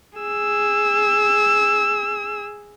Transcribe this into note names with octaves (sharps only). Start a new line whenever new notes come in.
G#4 E6